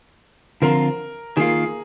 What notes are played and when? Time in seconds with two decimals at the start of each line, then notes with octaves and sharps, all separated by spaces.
0.62 D3 F3 C4 F4 A#4
1.37 D#3 A#3 F4 G#4